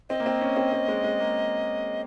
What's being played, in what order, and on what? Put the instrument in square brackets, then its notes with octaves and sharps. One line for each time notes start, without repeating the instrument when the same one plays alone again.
[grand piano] C4 [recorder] D#5
[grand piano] A#3
C4
C#4
C4
C4
G#3
G#3
A#3